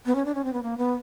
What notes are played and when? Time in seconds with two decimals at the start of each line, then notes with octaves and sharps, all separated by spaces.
0.06 B3
0.15 C#4
0.25 D4
0.35 C#4
0.44 C4
0.53 B3
0.63 A#3
0.77 B3